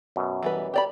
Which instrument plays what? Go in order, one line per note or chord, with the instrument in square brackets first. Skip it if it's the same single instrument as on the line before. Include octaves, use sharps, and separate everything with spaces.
[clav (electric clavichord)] F#2 B2
[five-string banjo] E3 G3 B4
G4 D5 B5